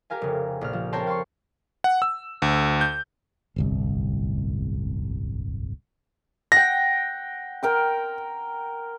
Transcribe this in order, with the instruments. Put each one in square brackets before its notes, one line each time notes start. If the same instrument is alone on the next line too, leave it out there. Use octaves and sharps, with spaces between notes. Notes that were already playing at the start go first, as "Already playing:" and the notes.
[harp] G4 A#4 F5 G#5
F1 C#3
A#1 F6
F3
C4 A#4 C#5 G5 A5 C6
F5 G5 C6 C#6
[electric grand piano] F#5
E6
D2
G6
[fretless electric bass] D1 G1 C2
[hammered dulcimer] F#5 G5 [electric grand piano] A#6
[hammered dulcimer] A#4 G5 C6